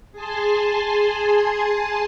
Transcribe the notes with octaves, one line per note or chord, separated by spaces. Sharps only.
G#4 G#5 A5 C6